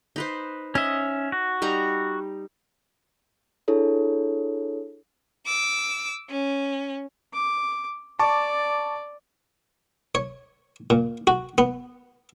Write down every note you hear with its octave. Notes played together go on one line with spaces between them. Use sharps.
D#4 B4 C5
C#4 D#5 E5
F#4
G3 D#4 A#5
D4 E4 G#4 A4 C#5
D6 E6
C#4
D6
D5 A5 C#6 D6
C#5
A#2
F#4
B3